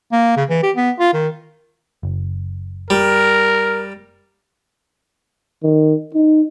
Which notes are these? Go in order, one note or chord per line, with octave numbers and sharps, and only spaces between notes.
A#3
C#3
E3
G4
B3
F4
D#3
F#1
G3 A#4
D#3
D#4